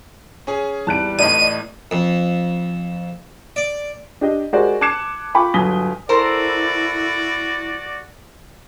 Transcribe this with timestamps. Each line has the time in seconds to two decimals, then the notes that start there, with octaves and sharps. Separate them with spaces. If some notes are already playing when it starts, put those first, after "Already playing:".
0.47 C#4 G#4
0.87 E2 G3 A5 F#6 D7
1.19 A1 A2 D5 D#5 D#7
1.91 F2
3.56 D5
4.21 D4 G4 D#5
4.53 G#3 F#4 G4 A#4 C5 D5
4.81 A5 D6 F#6 G#6 C#7 E7
5.34 F4 G5 B5 C#6 D6
5.54 G1 F#3 G#5 D#6 B6 G7
6.09 E4 F#4 A4 A#4 C5 D5